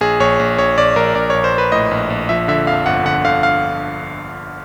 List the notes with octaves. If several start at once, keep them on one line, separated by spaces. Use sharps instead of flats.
A#1 G#4
A#1 C#5
A#1
A#1 C#5
A#1 D5
A#1 A#4
A#1 D5
A#1 C#5
C5
A#1 B4
A2 D#5
A#1
A#1
F3 E5
D3 E5
F2 F5
G1 F#5
D3 F#5
D3 F5
F5